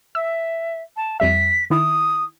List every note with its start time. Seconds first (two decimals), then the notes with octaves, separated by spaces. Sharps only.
0.15 E5 E6
0.96 A5
1.20 F2 G3 E5 B6
1.70 D#3 E4 D#6